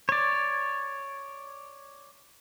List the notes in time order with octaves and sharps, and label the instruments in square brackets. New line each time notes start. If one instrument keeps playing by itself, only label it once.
[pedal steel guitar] C#5 D5